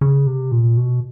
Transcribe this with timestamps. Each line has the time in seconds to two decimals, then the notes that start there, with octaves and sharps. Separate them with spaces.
0.01 C#3
0.27 C3
0.52 A#2
0.77 B2